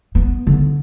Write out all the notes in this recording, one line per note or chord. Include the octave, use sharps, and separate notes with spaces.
B3
D3